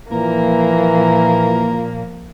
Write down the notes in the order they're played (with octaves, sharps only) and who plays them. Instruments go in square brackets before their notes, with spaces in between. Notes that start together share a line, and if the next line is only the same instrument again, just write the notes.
[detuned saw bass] A#2 [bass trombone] E3 [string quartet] F3 A#3 [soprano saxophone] A#4